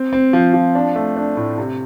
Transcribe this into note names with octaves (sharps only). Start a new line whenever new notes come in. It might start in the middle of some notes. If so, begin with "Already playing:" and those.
Already playing: C4
C4
F3
F3
D4
A3
D4
A2
C3